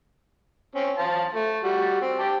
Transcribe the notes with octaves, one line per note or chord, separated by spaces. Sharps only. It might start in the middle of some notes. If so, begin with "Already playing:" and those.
C4 C#4
C5 F5 A5
A3
G3 F#4
C4
G4 A5